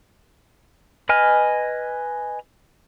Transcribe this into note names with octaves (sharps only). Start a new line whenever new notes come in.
B4 D#5 G#5 F6